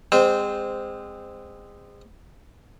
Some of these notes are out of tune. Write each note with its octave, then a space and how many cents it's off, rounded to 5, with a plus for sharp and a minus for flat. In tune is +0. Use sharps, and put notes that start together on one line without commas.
G#3 -35 C4 -20 C5 -15